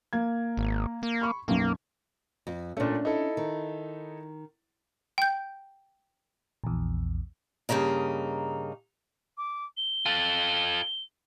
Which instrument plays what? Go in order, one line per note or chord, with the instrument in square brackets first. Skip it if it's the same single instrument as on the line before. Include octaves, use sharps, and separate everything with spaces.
[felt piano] A#3 G#6
[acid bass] G#1
A#3
[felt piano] B5 C#6
[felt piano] B1 F#2 [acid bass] A#3
[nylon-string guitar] F2
[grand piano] A#2 A3 [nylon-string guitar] C#4 D4
[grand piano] D#4 E4 A4
[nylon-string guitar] D#3
[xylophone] G5 G6
[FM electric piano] A#1 E2
[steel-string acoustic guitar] G2 A#2 C#3 A#3 D#4
[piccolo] D6
G7
[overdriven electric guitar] F4 A4